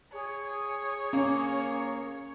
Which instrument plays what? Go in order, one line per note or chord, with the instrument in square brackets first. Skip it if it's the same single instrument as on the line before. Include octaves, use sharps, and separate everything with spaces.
[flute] G#4 [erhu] C#5
[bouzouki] A#3 [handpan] C#4